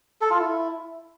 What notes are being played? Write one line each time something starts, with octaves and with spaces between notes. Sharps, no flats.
A4
F4
E4